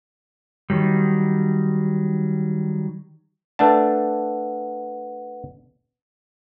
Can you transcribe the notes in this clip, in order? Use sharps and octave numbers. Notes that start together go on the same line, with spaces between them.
D#3 F#3 G3
A3 D4 B4 F#5 A5